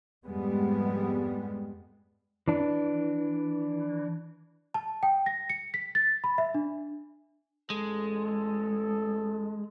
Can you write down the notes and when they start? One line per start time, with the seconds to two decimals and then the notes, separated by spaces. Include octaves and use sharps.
0.25 F2 G#2 G3 G#3 B3
2.48 E3 D4
4.74 A5
5.03 G5
5.26 A#6
5.50 C#7
5.74 B6
5.95 A6
6.24 B5
6.38 E5
6.54 D4
7.70 A1 G#3 A4